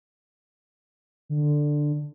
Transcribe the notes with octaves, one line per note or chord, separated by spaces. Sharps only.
D3